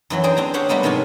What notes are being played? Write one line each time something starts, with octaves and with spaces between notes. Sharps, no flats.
F#2 E3 F#3
D4 G#4 C5 G5
C4 D4 A#5
G4 C5 C#5 F5 F#5
G3 G#3 A#3 B3 C#4
G#2 C3 F3 F4 C#5 G#5